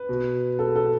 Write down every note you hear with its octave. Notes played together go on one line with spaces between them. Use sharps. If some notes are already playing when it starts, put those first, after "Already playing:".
Already playing: B4
B2
A4
A4